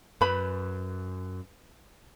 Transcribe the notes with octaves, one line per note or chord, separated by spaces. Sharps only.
F#2 B4 B5